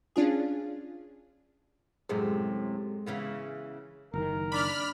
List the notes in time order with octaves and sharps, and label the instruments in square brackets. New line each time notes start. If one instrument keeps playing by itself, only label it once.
[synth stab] C#4 D4 F4 G#4
[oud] F#2 A2 C3 [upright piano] G#3
[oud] C#3 E3 B3
[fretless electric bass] F#1 D#3 [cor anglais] A#4
[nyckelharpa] D4 [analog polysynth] B5 F6